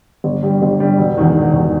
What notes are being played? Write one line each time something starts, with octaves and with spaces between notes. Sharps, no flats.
G1
G2 G3
G1
G2 G3
E1
E2 D#3
E1
E2 D#3